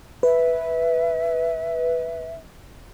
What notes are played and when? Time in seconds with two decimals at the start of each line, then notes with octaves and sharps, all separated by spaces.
0.23 B4 E5